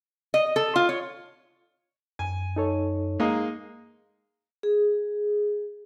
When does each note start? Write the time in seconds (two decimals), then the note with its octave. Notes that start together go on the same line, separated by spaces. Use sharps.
0.34 D#5
0.56 A4
0.76 F4
0.89 C#5
2.19 F#2 G#5
2.56 D#4 A4 C#5
3.20 G#3 A#3 D#4
4.63 G#4